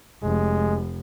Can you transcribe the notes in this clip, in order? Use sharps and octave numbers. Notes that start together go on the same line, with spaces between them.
F1 G#3